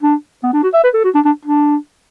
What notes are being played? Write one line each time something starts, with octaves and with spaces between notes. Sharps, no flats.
D4
B3
D4
F#4
E5
B4
A4
F#4
D4
D4
D4